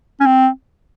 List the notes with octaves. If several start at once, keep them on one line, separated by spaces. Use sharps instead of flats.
C#4
C4